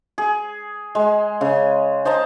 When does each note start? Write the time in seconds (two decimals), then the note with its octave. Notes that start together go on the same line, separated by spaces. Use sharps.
0.18 G#4
0.95 G#3
1.41 C#3
2.05 C5 D#5 A5 A#5